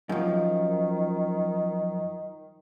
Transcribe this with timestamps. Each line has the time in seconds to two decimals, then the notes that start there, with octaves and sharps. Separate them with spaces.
0.09 F#2 D#3 F3